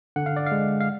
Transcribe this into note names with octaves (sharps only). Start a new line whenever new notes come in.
D3 F#5
F5
D5
F5
G#3
F5